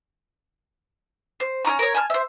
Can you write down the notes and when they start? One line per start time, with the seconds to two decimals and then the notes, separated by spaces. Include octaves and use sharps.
1.40 C5
1.65 C#4 F4 A#5 C#6
1.79 A#4 C#5
1.94 G#5 A5 B5 F6
2.10 C5 E5